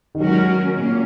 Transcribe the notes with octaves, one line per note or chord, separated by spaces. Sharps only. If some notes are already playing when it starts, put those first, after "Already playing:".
D#3
F#3 G#3 C#4 F#4 A#4
A#2 A#3 C#4